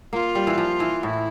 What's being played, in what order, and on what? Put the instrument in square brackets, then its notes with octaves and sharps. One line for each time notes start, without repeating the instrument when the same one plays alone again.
[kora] A#3 [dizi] F4
[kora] G3
E3
F3
E3
[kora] A2 [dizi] E4